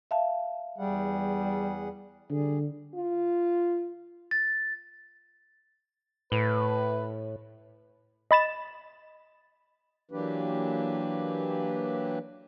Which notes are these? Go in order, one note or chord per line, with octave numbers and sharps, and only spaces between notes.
E5 F5 A5
E2 G3 G#4 F#5
D3 G3 G#4
F4
A6
A2 B4
D#5 B5 A6 E7
E3 F#3 A#3 D4 G4 B4